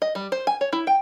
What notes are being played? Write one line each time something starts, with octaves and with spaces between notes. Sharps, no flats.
D#5
G3
C5
G#5
C#5
E4
G5